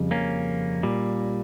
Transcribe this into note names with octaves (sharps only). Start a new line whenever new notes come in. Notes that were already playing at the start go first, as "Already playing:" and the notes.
Already playing: F2 C#3 G3
A#3 C#4
A#2 G3